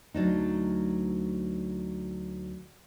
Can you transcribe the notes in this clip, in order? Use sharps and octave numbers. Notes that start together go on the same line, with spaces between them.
D2 F#3 D4 D#4